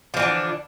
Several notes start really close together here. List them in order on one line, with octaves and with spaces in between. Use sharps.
F3 E3 D3 D4